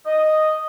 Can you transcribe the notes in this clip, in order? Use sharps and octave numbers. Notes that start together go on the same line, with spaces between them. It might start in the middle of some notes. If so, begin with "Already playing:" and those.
D#5